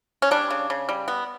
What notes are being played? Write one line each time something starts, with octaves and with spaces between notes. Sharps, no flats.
C#4
G3 D4
C#3
C#3
G3
B3